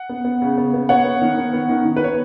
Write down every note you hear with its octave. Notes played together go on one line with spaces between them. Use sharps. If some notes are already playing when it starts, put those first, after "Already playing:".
Already playing: F#5
B3
B3
C#3
B3
B3
B3 C#5 F#5
B3
D#3
B3
B3
D#3
D#3
B4
B3 C#5